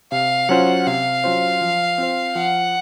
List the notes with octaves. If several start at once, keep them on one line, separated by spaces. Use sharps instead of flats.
C3 F5
F#3 C#4 F4 C5 F#5
C3 F5
F#3 C#4 F4 C5
F3
C4 F4 C5
F3 F#5